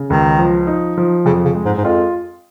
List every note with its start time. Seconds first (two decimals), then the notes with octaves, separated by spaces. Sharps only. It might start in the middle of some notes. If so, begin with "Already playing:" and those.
Already playing: C#3
0.10 C#2 D#3
0.39 F3
0.67 D#4
0.97 F3
1.26 F2 C#3
1.45 C#3
1.55 G#3
1.65 G#2
1.78 G#2
1.84 F2 F4